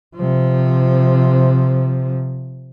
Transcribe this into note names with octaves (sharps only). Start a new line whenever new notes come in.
C3 F3